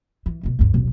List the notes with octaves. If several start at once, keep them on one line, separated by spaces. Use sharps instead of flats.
E3
D2 B2
D2 G2
D#1 B1